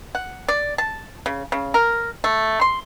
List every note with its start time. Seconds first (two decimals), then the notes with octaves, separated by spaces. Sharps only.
0.15 F#5
0.48 D5
0.78 A5
1.26 C#3
1.52 C#3
1.74 A#4
2.24 A3
2.61 C6